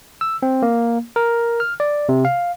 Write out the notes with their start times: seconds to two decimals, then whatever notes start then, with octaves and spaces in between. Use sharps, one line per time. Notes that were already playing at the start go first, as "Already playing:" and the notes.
0.21 E6
0.43 C4
0.62 A#3
1.16 A#4
1.60 F6
1.80 D5
2.09 C3
2.25 F5